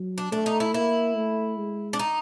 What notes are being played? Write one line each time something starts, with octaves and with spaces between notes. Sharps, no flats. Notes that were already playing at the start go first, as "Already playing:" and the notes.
Already playing: F#3
D4
A3 D4
D#4
E4
A#3 E4
A3
G#3
D4
D#4